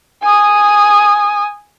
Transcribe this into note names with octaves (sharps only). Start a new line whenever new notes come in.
G#5 D#6